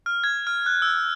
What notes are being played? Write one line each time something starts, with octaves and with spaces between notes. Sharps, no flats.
F6
G#6
F6
F#6
E6